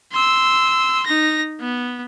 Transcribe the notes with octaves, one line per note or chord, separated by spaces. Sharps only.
C6 E6
D#4 A#6
B3